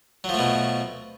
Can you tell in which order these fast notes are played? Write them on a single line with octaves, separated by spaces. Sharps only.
F#3 F3 A3 B2